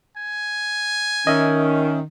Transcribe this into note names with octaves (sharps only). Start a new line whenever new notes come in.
G#5
D#3 C#4 D#5 E5